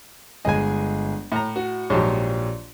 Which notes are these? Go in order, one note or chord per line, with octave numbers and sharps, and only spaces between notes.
G1 G#3 G#4 D#5 G#5
A2 A#5
F#4
A#1 G#2 F3 F#3 G4 C#5